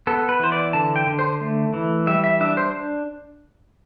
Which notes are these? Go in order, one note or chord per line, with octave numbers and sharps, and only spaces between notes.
B3 A4
B4
E3 C5
D5
D3 A5
G5
D3
C5
A3
E3
G3 E5
E5
D4 E5
C5